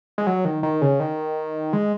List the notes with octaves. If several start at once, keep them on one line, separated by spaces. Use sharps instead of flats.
G#3
F#3
D#3
D#3
C#3
D#3
G#3